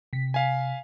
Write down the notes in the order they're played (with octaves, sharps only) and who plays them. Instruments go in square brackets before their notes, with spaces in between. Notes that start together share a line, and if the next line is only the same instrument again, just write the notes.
[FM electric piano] C3 B6
[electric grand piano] F5 G#5